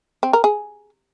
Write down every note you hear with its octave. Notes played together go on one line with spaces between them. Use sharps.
C4
A#4
G#4